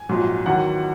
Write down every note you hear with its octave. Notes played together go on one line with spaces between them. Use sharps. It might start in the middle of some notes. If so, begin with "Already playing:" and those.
Already playing: G#5
A#1 G#2 F#3
E2 D#3 F#3 F#5